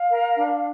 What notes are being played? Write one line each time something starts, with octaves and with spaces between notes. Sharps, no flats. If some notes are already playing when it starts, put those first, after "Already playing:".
Already playing: F5
A#4
D4